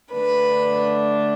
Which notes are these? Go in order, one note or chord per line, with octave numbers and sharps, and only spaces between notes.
D3 A3 D4 B4